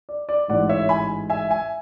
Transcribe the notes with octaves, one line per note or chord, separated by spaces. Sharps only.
D5
D5
A1 G#2 E3 D5 F#5
C#5 E5
G#5 B5
E5 G#5
E5 G#5